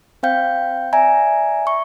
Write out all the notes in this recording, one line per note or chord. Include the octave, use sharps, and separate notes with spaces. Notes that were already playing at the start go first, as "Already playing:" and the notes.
C4 C5 F5 G5 G6
D5 E5 G#5 A#5
E5 C#6